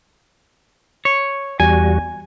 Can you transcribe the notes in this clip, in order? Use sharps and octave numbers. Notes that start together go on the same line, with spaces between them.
C#5
E2 G3 F#4 G#5